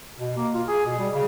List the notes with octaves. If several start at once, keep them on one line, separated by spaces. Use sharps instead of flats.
B2
A#3
F4
G#4
B2
G3
C#3